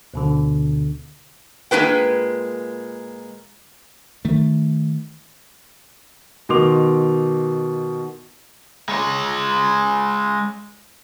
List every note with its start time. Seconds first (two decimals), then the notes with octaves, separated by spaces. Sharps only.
0.14 D2 B2 D3
1.71 A#2 G#3 D4 G#4 B4 G5
4.25 D#3 A3
6.49 B2 D#3 C6 D6 F7
8.89 G#3 C#5